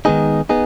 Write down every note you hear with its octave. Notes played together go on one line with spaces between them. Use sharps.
D#3 G#3 B3 D#4 G#4
B3 D#4 G#4